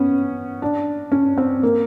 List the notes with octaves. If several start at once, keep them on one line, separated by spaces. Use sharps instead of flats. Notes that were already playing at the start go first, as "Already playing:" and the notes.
Already playing: B3 C#4
D4
C#4
C4
A#3